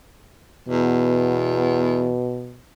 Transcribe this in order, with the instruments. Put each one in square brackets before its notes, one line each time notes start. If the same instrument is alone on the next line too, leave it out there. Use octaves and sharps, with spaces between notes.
[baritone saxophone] E2 [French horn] B2